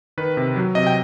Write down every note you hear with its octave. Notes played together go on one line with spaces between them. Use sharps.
D#3 B4
C3
F#3
C3 D#5
G5